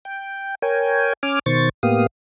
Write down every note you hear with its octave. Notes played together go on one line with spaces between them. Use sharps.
G5
A#4 C#5 G5 G#5
C#4 G#5 D6 F6
B2 D#3 C5 C#6 A6
A2 A#3 B3 G4 F5 D#6